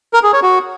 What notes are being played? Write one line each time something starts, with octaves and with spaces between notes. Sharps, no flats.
A#4
G#4
C#5
F#4